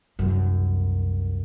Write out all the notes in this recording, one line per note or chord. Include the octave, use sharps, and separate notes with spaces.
C2 F#2